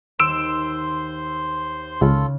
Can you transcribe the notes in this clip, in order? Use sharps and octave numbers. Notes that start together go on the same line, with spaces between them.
D#2 C5 C6 E6 D7 E7
C#2 C#3 F4 A4